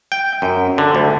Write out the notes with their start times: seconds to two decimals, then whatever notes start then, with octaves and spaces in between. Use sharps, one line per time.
0.12 G5
0.42 F#2
0.78 D3
0.95 D2